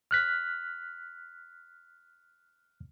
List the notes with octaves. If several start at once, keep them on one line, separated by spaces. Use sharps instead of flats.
F6 F#6 B6